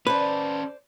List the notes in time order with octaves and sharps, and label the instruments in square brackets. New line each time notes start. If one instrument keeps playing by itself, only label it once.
[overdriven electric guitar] C#4 A4 [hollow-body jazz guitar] B4 [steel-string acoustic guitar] C5 D5